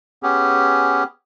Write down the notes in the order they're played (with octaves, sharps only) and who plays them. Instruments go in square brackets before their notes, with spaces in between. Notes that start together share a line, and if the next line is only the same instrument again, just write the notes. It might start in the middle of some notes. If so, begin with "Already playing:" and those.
[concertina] B3 C#4 G4 G#4